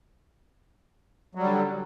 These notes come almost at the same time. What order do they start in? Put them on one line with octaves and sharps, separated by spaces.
F#3 G3 D3